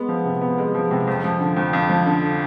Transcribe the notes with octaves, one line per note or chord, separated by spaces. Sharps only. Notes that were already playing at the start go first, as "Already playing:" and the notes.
Already playing: G#3 B3
F3
C3
B3
G#3
F3
C3
F2
F3
D3
F2
F2
F3
D3